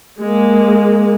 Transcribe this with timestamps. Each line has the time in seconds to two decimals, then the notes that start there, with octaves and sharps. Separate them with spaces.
0.20 G#3 A#3